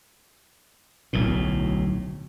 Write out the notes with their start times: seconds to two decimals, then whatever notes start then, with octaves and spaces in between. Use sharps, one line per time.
1.13 D1 B1 A2